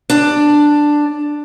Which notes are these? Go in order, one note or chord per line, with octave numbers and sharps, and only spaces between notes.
D4